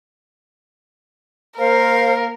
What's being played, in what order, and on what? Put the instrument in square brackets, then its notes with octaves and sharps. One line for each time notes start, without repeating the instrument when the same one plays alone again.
[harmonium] A#3 [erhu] A#4 [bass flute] C5 [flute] F5